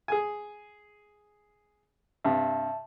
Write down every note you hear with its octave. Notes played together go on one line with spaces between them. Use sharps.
G#4 G#5
G2 C3 E5 A5